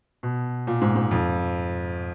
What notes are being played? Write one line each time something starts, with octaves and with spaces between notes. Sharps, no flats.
B2
A#2
G#2
G#2
F2